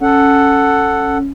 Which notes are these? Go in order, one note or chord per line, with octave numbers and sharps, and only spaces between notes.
C#4 A4 F#5